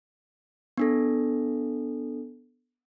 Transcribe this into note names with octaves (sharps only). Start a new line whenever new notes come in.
B3 D4 A4